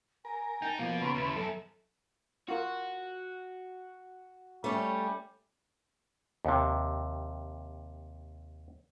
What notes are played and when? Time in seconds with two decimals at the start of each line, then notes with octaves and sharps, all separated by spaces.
0.25 A#4 G#5
0.62 D#4 G5 A5
0.79 B2 F3 A#3 F5
1.01 C#3 A4 B4 A#5 C6 C#6
1.15 D#2 E4 A5
1.36 F#2 B3 D#4 A4 E5 A5
2.49 F4 F#4 A#4
4.64 G3 A3 C#4
6.45 D#2 C3